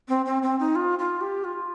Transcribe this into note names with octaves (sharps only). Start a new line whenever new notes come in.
C4
C4
C4
D#4
F4
F4
G4
F4